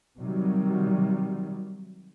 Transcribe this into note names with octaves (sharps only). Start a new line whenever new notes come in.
C3 D#3 F#3 G3